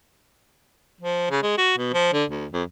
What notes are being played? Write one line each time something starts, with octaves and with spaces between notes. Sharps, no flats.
F3
C#3
G#3
F#4
B2
F3
D3
D2
F2